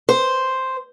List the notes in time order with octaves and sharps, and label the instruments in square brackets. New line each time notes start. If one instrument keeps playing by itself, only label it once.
[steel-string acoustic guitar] C5